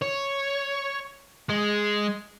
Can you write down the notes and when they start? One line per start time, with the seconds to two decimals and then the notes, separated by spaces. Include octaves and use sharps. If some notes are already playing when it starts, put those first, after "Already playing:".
0.02 C#5
1.50 G#3